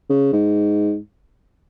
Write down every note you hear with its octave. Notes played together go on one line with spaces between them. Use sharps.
C#3
G#2